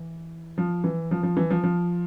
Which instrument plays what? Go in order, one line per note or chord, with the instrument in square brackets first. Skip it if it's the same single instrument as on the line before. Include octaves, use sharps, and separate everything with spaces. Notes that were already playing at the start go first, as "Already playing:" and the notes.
Already playing: [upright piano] E3
F3
E3
F3
F3
E3
F3
F3